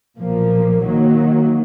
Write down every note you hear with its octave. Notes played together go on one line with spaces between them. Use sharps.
B1 A#2 F3 A#3
D#3 F#3 A#3